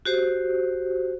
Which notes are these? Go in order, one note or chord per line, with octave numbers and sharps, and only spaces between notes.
F#4 G4 C5